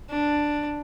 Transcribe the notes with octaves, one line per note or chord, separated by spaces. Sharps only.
D4